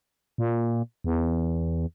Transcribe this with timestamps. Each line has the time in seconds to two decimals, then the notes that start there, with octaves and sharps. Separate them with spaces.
0.38 A#2
1.04 E2